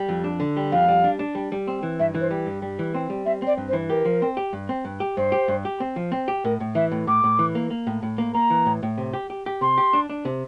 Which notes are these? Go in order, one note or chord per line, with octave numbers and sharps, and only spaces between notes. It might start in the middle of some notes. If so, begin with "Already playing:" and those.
Already playing: G3
F2
D4
D3
G3
F2 F5
G3
D4
D4
G3
G3
C4
E3
G2 E5
E3
C5
G3
G2
G3
E3
C4
G3
C4 E5
C4 D5
G2
C5
E3
G4 A#4
F3
C4
G4
G2
C4
G2
G4
G2 C5
G4
G2
G4
C4
F3
C4
G4
A2 A#4
A2
E3 E5
A2
A2 D6
A2
E3
A#3
A#3
A2
A2
A#3
A#3 A#5
E3
A2
A2
C3
G4
G4
G4
C3 C6
G4
D4
D4
C3